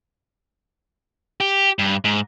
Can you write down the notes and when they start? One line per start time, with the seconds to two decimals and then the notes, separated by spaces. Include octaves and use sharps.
1.41 G4
1.79 G2
2.05 G#2